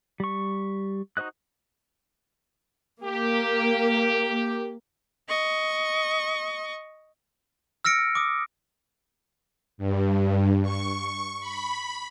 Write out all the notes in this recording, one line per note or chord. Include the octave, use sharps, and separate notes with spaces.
G3 C#6
D#4 F#4 C5 D#5 F#6
A#3 G4
D#5 C#6
E6 F6 A#6 C#7 D7
D6 D#6
G2
C#6
B5